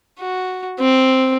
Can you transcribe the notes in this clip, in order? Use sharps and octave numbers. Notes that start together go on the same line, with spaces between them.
F#4
C4